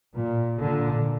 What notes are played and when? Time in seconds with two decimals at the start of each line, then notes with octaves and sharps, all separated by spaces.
0.14 A#2
0.60 A#2 D3